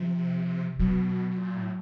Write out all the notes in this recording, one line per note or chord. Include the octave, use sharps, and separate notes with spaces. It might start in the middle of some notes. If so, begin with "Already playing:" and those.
Already playing: C3 F3
B2 F#3
B2
A#2
A2